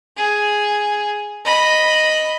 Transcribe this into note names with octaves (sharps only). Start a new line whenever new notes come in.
G#4
D#5 B5